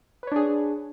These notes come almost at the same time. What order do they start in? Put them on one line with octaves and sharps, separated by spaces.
B4 C#5 D4 G#4